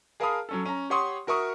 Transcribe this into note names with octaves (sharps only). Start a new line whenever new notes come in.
G#4 A#4 F5 A5 B5 D#6
F#3 C#4 A4
C#4 A#5
G4 C#5 F#5 C6 C#6 D#6
F#4 A#4 E5 C#6 D#6